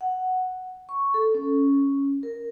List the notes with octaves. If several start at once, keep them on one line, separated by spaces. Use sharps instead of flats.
F#5
C#6
A4
C#4
A#4